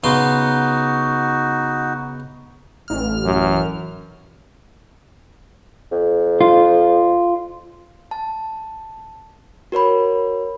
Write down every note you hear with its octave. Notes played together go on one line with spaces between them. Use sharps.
C#3 B3 D#4 F#4 C6
A1 F6
F#2
F2
F4
A5
F#4 A#4 C#5 B5